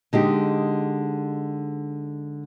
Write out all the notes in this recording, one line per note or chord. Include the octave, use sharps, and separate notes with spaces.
D3 G#3 D#4 G4